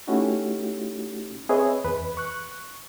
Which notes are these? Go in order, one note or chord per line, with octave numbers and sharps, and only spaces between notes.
A3 C#4 D#4 E4 F#4 G4
C4 G#4 B4 C#5 D#5 E5
E2 B4
C#6 F#6